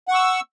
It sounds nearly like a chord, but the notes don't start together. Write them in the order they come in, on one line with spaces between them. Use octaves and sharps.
F#5 C#6 E6